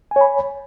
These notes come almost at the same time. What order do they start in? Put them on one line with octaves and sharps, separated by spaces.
G#5 C#5 B5